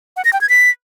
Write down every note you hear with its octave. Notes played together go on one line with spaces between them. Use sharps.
F#5
A#6
G5
G#6
B6